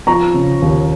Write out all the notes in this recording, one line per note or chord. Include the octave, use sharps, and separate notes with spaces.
F3 A#5 C#6
C#3
D#2